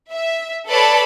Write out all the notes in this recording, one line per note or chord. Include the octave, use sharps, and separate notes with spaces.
E5
A4 B4 C#5 D5 A5 B5